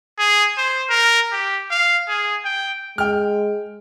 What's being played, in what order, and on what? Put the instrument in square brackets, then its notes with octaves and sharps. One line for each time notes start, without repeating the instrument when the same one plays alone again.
[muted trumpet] G#4
C5
A#4
G4
F5
G#4
G5
[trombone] G#3 [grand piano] G5 F6